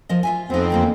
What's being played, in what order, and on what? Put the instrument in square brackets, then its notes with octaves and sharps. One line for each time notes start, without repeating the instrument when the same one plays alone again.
[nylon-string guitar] F3 A#4 D#5
F4 E5 G#5
[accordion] F2 C4 [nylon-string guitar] B3 D#4
[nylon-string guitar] E2 D3 A#3